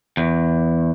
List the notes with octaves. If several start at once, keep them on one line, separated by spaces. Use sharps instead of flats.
E2